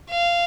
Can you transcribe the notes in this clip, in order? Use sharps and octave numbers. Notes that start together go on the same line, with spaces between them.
F5